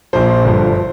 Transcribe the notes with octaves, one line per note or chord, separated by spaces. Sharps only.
A#1 A#2 F3 C5
G1 G2 D3 F3